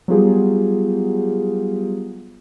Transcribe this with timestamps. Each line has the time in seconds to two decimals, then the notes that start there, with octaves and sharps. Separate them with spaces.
0.08 F#3 G3 B3 F4 G4 G#4